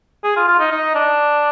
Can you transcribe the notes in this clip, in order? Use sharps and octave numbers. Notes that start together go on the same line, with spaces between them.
G#4
F4
F4
D#4
D#4
D4